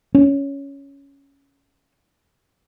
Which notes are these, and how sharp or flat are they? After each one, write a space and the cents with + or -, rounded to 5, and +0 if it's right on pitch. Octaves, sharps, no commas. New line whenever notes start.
C#4 +5